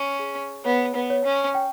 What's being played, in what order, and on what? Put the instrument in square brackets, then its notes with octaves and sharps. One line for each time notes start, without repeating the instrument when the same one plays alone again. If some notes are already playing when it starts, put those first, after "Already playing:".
Already playing: [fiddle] C#4
[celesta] G#4
[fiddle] B3 [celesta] C#5
[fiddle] B3
[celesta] C#5
[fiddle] C#4
[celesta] G5